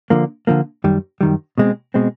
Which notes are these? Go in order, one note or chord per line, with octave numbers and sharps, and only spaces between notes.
D3 F3 A#3
D3 F3 A#3
F#2 D#3 G3
F#2 D#3 G3
B2 G#3 C4
B2 G#3 C4